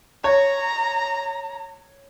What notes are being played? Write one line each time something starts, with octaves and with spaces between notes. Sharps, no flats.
C#5 A#5